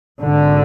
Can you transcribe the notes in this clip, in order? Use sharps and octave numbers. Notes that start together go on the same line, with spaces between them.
G#1 G#2 D3